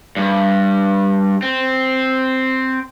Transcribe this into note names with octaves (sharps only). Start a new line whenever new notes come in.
G2
C4